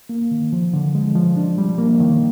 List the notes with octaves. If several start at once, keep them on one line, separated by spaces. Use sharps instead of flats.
A#3
D#3
F3
D3
G#3
F3
D4
G3
A#3
D#3